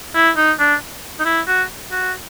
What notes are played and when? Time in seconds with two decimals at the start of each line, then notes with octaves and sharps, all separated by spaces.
0.15 E4
0.36 D#4
0.59 D4
1.19 D#4
1.25 E4
1.47 F#4
1.92 F#4